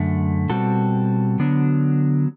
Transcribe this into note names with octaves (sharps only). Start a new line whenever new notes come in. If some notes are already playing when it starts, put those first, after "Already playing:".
Already playing: F#2 D3 A3
B2 G3 C4 F#4 A4
D3 F#3 B3 D4